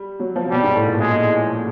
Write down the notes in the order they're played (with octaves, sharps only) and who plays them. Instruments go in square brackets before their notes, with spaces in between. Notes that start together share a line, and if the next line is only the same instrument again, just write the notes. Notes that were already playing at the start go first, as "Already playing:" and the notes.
Already playing: [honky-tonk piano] G3
F#3
F3
C3
[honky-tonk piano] B2 [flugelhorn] G3
[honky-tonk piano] G#2
A2
A#2
[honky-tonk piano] A#2 [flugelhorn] G#3